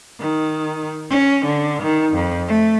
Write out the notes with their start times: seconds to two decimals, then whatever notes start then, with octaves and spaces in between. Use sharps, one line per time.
0.20 D#3
1.10 C#4
1.46 D3
1.82 D#3
2.15 F2
2.48 A3